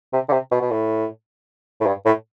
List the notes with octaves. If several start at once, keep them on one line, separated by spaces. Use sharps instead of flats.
C3
D3
C3
B2
B2
A2
A2
G2
A2